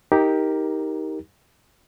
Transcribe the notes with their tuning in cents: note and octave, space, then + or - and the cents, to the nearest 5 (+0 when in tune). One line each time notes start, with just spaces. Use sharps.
D#4 +20 G4 +0 A#4 +0